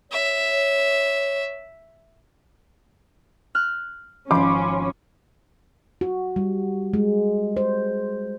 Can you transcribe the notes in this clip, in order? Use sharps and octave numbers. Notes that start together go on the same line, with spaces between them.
C#5 E5
F6 F#6
G#1 F3 C#4 B5 C6 D6
F#4
G3
G#3
C5